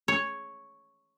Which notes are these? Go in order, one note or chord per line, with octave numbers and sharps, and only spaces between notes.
C#5